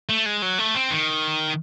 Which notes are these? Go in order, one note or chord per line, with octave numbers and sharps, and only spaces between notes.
A3
G#3
F#3
A3
C4
D#3